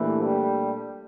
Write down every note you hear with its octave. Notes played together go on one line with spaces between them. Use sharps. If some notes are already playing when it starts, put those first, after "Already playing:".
Already playing: A#2 E3 A3 D4 G4
G3